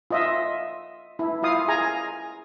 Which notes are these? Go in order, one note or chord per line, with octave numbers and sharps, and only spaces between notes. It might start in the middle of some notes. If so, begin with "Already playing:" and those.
F4 D#5 E5
E4
E4 F4 F5 D#6
G#4 G#5 A#5